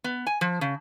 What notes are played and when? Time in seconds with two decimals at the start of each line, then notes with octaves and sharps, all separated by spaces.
0.04 B3
0.27 G#5
0.41 F3
0.61 C#3